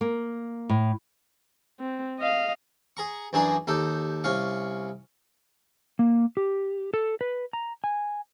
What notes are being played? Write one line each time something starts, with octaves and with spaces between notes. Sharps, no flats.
A#3
A2
C4
D#5 F5
G#4 A#5 C#6
F#2 E3 D4 G#4 A#5 C6
D#2 D#4 G4 A4
C2 C#4 F5 C#6
A#3
G4
A4
B4
A#5
G#5